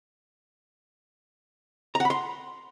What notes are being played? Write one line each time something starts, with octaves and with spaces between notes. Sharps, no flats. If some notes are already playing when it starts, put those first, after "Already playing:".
A#5
F#5
B5
C6